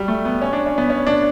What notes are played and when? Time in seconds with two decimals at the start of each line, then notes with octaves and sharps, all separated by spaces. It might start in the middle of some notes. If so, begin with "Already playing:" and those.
Already playing: F#3 G3
0.08 A3
0.25 B3
0.42 C#4
0.53 D4
0.66 C#4
0.78 B3
0.90 C#4
1.07 D4